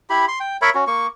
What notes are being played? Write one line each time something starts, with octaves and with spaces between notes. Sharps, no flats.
E4 G4 B5
C6
G5
A#4 C#5 E5 B5
C#4 F#4
A#3 C#6